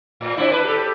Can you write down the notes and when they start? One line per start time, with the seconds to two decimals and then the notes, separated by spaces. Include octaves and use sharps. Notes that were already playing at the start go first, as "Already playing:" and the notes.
0.21 A2
0.37 C4 D4 E4
0.52 B4
0.64 G4 A4